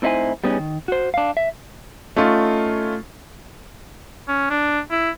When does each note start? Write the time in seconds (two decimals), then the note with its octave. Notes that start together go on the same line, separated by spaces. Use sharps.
0.02 A2 C4 D#4 E4 C5 G#5
0.44 G3 B3 C#4 D#4 G#4
0.59 D#3
0.88 F#4 C5
1.14 D4 F5
1.37 E5
2.16 A3 C#4 D#4 F4
4.28 C#4
4.50 D4
4.91 E4